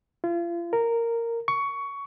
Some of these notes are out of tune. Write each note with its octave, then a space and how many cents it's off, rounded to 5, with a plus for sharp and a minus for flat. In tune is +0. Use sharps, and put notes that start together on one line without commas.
F4 -35
A#4 -10
C#6 +15